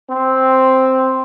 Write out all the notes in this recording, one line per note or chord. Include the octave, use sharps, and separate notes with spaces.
C4